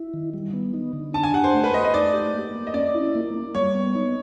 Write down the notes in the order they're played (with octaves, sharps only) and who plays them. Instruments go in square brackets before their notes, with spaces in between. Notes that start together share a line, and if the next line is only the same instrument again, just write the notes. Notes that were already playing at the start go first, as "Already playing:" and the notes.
Already playing: [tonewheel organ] E4
D#3
G3
B3
D#4
D3
[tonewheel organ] D4 [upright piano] A5
[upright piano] G#5
[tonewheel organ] G4 [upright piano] F#5
[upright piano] C5
[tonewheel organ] A3
[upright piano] B4
[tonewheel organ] A3 [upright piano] D#5
[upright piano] D#5
[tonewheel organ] D#4 [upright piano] D5
[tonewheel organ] G4
A#3
A#3
[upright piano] D#5
[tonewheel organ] C#4 [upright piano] D5
[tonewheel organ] E4
A#3
A#3
[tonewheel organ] G3 [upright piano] C#5
[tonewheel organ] B3
D#4